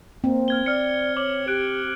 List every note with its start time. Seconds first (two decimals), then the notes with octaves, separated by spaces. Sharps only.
0.24 A#3 C4
0.48 F6 G#6 G7
0.66 D5 F6 C#7
1.17 C#5 D6 F#7 G7
1.48 G4 F#6 D7